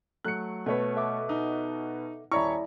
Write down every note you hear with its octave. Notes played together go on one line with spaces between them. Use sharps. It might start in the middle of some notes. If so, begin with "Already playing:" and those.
F#3 A3 F#6 C#7
B2 A3 B4 C#5
A4 E5 D6
D#4
D#1 E4 C#5 D5 E5 A#5 B5 C#6